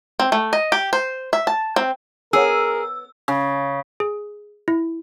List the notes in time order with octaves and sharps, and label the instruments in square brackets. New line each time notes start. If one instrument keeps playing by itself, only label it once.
[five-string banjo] C4
A3
D#5
G4
C5
E5
A5
C4
[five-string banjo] B3 C#5 F#5 [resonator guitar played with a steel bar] G#4 [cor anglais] A#4 [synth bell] E6
[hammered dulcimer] C#3
[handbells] G#4
E4